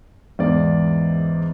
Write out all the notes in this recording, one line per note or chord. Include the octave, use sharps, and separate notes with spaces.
E2 G#2 D5